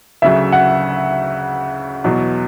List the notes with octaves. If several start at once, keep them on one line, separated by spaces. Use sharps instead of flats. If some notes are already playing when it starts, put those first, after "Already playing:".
D2 C#3 F#3 E5
F#5
E2 B2 F#3